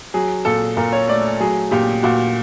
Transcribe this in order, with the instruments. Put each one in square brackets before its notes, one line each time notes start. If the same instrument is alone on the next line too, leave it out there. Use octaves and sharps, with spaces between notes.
[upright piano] F#3 G#4
A#2 A4
A#2 A#4
C#5
A3 D5
F#3 G#4
A#2 G4
A#2 F#4